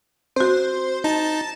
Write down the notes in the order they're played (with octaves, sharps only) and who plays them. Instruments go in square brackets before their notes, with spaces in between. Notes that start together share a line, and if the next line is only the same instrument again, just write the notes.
[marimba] C4 F#4 [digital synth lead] C5
[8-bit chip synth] D#4 [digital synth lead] A5